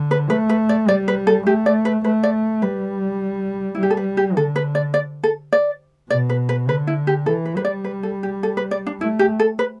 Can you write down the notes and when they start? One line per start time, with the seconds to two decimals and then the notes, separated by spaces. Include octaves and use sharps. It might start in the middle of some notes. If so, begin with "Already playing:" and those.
Already playing: D3
0.11 B4
0.30 A3 B4
0.49 B4
0.69 D5
0.88 G3 D5
1.08 B4
1.27 A4
1.46 A3 G4
1.66 D5
1.85 B4
2.04 A3 B4
2.23 D5
2.62 G3 B4
3.75 E4
3.79 G3 G4
3.91 A4
3.97 B4
4.17 G4
4.36 D3 A4
4.56 B4
4.75 D5
4.94 D5
5.24 A4
5.53 D5
6.10 B2 D5
6.30 B4
6.49 B4
6.68 D3 B4
6.87 E4
7.07 G4
7.26 E3 A4
7.45 B4
7.56 G3 B4
7.65 D5
7.84 B4
8.03 A4
8.23 G4
8.43 A4
8.57 B4
8.71 D5
8.87 D4
9.00 A3 E4
9.19 G4
9.40 A4
9.59 B4